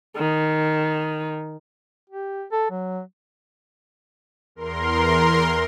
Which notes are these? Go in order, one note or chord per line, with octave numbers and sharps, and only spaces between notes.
D#3
G4
A4
F#3
E2 A#4 C6